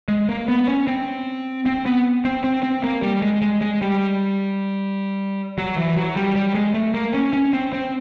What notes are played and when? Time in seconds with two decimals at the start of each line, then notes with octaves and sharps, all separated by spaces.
0.08 G#3
0.29 A#3
0.48 B3
0.68 C#4
0.87 C4
1.66 C4
1.86 B3
2.25 C4
2.44 C4
2.63 C4
2.84 A#3
3.02 G3
3.22 G#3
3.42 G#3
3.61 G#3
3.82 G3
5.58 F#3
5.76 E3
5.97 F#3
6.16 G3
6.35 G3
6.55 G#3
6.74 A3
6.94 A#3
7.14 C#4
7.33 C#4
7.53 C4
7.73 C4